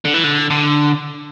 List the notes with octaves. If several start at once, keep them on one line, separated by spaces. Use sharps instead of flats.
D3
E3
D3
D3